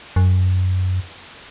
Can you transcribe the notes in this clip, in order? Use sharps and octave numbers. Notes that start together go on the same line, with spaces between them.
F#2